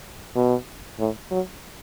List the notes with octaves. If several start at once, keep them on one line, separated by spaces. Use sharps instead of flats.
B2
A2
F#3